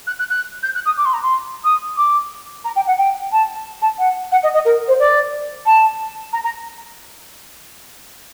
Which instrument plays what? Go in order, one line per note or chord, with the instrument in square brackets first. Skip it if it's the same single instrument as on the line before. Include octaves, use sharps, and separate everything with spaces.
[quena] F#6
F#6
F#6
G6
F#6
D#6
D6
C6
A#5
C6
D#6
D6
A#5
G5
F#5
G5
A5
A5
F#5
F#5
D#5
D#5
A#4
C5
D5
A5
A#5
A#5